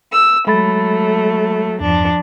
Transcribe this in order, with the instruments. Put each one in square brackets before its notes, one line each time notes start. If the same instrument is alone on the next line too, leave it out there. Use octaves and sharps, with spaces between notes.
[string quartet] E6
[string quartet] F#3 A3 [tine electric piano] G#3 B5 A6
[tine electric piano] E2 G2 [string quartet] F3 D4